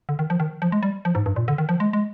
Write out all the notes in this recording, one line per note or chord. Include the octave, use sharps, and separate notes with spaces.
D3
D#3
F3
D#3
F3
G#3
G3
F3
G#2
G2
A#2
D3
D#3
F3
G#3
G#3